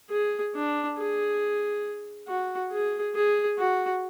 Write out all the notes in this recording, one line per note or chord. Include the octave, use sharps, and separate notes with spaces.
G#4
D4
G#4
F#4
G#4
G#4
F#4